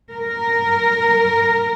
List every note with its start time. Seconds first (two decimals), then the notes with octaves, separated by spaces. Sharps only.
0.13 A#4